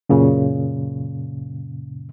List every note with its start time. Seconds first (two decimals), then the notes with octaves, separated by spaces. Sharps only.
0.09 F#2 A#2 C#3